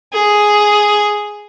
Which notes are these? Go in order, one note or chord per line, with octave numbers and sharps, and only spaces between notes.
G#4